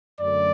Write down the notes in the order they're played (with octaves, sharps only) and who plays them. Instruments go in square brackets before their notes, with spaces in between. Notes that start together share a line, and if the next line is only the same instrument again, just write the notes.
[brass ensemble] F#2 D3 A3 D5